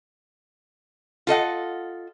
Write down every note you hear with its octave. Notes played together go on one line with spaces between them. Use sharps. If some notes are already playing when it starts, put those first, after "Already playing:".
F4 A4 D#5 F#5